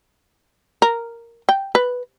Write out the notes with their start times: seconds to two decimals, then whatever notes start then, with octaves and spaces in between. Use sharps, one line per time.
0.82 A#4
1.49 G5
1.75 B4